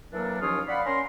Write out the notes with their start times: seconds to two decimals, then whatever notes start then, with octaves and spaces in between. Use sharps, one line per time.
0.13 E3 F#3 A#3 D4 A4 A#4
0.42 D#2 F3 C#4 F4 C#5 D#6
0.69 D5 F5 F#5 B5
0.86 C#4 A#4 C6